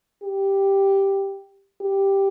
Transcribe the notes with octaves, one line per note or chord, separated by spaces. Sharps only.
G4
G4